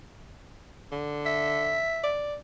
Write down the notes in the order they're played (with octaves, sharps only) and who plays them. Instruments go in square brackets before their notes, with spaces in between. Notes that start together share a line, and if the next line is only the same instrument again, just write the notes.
[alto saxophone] D3
[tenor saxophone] E5
[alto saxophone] D5